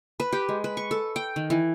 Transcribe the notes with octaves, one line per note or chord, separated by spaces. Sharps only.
B4
G4
G#3
B4
C#6
A4
G5
D#3
E3